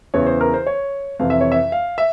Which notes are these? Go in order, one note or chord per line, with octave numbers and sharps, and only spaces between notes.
E2 C#3 E3 C#5
C5
A#4
C5
C#5
F2 C3 E3 F5
E5
C#5
E5
F5
E5